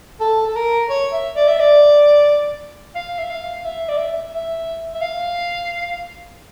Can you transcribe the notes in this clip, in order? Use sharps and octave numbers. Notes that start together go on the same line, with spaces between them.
A4
A4
A#4
C#5
E5
D5
E5
D5
F5
E5
F5
E5
D5
E5
E5
E5
F5